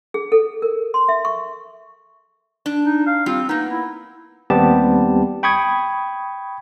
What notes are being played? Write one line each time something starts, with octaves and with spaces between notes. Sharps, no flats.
G#4
A4
A#4
C6
E5
C#6
D4
D#4
F5
G3 C4 F4
A#3 B3 D#4
E4
D#2 G3 B3 C4 G4 A5
G5 B5 C#6 D#6 G#6